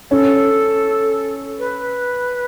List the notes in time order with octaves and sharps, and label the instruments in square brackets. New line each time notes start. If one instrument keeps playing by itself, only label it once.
[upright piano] C#4 [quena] A4
[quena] B4